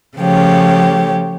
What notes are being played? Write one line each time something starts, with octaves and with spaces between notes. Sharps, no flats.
C#3 F3 A3 G4 C#5